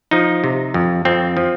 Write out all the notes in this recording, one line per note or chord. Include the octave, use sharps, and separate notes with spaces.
F3 D#4
C3
F2
F2 C4
F3